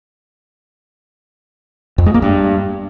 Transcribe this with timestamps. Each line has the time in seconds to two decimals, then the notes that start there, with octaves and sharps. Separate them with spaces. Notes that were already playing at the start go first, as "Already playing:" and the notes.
1.98 F2
2.06 G#3
2.14 A#3
2.22 G2